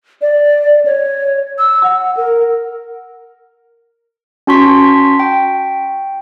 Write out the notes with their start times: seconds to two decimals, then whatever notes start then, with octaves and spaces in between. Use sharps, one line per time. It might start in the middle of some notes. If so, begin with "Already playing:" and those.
0.21 D5
0.85 C#5
1.58 E6
1.84 F#5
2.17 A#4
4.47 C#4 F#4 A5 C6 C#6 B6
5.19 G5